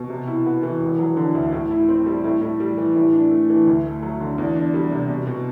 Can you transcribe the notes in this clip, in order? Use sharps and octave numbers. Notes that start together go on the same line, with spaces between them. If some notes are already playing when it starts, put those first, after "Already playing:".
Already playing: B2
C3
E4
B3
E3
E1
F#3
D3
D2
A2
E4
C4
G3
A2
A2
G3
E3
A2
D4
A3
E3
D2
A3
F#3
D3
E2
D4
G3
C3
B2
B2